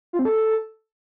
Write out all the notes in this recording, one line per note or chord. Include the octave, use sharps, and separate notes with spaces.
F4
C4
A4